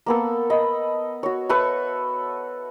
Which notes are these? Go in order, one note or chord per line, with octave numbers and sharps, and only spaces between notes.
A#3 B3 A4
D#5 B5
F#4 C#5
A4 B4 E5 C#6